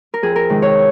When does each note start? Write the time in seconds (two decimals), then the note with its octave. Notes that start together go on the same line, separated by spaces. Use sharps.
0.14 A#4
0.22 F2 G#4
0.36 A#4
0.49 C3 D#3 G#3
0.62 C#5